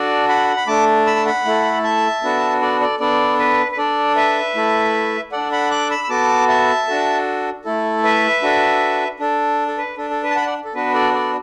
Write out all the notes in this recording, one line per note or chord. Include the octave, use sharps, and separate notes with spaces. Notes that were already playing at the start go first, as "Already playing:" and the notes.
Already playing: D4 F#4 A4 D5
F#5 B5
B5
A3 D4 A4 A5 D6
B5 E6
A5
F#5 B5
A3 E4 A4
E5 A5
B3 D4 F#4 A4
A4 D5
A4 D5
B3 D4 A4 D5
B4
B4
D4 A4 D5
B4 E5
A3 E4 A4
D4 A4 D5 F#5
F#5 B5
D6 F#6
B5 E6
E6
B3 F#4 A4 A5 D6
E5 A5
D4 F#4 A4
A3 E4 A4
B4 E5
D4 F#4 A4
D4 A4
A4
B4
D4 A4
A4
B4
A5
F#5 B5
A5
D5 F#5
A4
B3 D4 F#4 B4
A4 D5
A4 D5